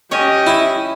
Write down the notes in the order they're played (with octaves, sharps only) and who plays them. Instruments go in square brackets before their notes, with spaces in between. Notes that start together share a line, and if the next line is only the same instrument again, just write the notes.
[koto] C#4 C#5 [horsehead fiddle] G4 [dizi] D#5
[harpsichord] E4